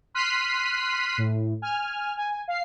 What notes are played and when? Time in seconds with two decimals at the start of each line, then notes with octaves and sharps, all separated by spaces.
0.14 C6 F6 F#6 B6 C7 D#7
1.18 A2
1.62 G#5 F6
2.17 G#5
2.48 F5 C7